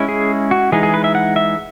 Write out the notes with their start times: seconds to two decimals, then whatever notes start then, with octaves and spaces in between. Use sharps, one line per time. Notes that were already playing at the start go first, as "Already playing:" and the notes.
Already playing: G#3 C#4 E4
0.09 G#4
0.51 F#4
0.72 E3 G#3 D#4 G#4
0.83 G#4
0.94 B4
1.04 E5
1.15 F#5
1.36 E5